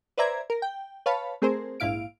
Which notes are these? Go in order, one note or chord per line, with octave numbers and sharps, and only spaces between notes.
B4 C5 D5 E5 A#5 G#6
A#4
G5
B4 C#5 F5 A5 B5
A3 C4 G#4 A#4 C5
A#1 G#2 E4 F5 D7